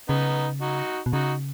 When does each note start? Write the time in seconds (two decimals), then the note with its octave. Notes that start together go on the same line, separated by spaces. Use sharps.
0.09 C#3 B3 D#4
0.61 D#4 F#4
1.06 B2
1.13 C#3 D#4 F#4